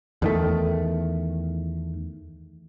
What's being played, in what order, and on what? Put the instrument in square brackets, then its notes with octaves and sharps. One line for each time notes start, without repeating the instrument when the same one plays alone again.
[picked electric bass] E2 D#3 A3